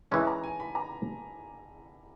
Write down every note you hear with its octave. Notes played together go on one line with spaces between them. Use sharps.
E3 G#3 C#4 A5
A#5
G#5
B5
A#5